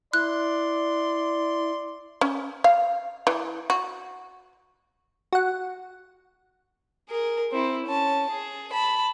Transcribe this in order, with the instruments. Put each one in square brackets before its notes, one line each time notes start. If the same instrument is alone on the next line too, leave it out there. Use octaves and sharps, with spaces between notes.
[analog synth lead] E4 [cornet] D5 [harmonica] C6 [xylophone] F#6
[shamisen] C#4
F5
E3
F#4
[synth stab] F#4 F#5
[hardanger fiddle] G#4 A#4
C4 E4
C#4 A5
G#4
A5 B5